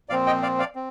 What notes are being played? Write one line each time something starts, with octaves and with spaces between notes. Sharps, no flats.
A#2 F3 C4 D5 F5
D#5 G5
D5 F5
D5 F5
C4